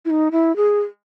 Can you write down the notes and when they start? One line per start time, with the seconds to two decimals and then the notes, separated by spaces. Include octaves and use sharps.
0.05 E4
0.10 D#4
0.32 E4
0.56 G#4